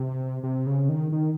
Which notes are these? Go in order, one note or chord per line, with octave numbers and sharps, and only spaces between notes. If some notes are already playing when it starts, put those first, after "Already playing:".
Already playing: C3
C3
C#3
D#3
D#3